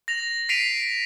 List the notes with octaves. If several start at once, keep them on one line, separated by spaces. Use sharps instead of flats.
A#6 F7
B6 C7 D7 D#7 F7